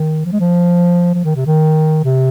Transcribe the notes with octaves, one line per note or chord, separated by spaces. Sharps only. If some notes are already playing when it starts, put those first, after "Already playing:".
Already playing: D#3
F3
G#3
F3
F3
D#3
C3
D#3
C3